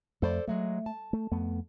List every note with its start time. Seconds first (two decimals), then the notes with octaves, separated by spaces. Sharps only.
0.22 F2 A3 A4 C5 D5
0.48 A2 F#3 G#3 A3
0.86 A5
1.13 A3
1.31 F2 A3 B3